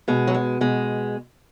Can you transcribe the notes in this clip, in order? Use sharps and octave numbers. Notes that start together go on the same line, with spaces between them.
B2 G#3
F#3
G#3
B2 G#3